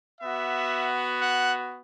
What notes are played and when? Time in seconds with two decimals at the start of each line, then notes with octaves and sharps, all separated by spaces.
0.21 B3 F#4 E5
1.21 F#5